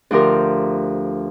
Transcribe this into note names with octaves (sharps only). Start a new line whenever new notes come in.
D2 F3 G4 A#4